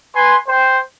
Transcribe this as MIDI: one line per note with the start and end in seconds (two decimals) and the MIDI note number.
0.14 0.36 71
0.14 0.36 80
0.14 0.36 84
0.48 0.78 72
0.48 0.78 79